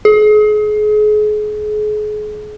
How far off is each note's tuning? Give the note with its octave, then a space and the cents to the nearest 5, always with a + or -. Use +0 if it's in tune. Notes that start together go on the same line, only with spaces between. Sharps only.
G#4 +35